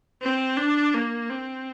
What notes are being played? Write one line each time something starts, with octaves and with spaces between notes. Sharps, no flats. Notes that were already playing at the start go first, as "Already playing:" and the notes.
C4
D4
A#3
C4